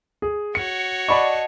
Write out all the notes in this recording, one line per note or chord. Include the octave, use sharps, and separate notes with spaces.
G#4
F#4 C#5 C#7
D5 D#5 F#5 A5 B5 C#6